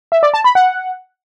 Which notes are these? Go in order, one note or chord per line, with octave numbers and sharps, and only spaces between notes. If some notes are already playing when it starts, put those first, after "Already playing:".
E5
D5
A5
B5
F#5